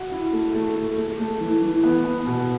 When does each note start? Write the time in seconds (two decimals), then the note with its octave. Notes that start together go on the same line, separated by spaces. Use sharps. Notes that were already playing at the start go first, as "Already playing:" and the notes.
Already playing: F#4
0.12 E4
0.33 A3
0.54 A3
0.76 A3
0.97 A3
1.19 A3
1.40 E3
1.62 E3
1.84 B3
2.05 B3
2.27 B2